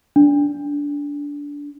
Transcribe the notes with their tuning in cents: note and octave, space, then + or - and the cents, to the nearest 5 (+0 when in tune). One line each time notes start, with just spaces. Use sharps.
D4 -20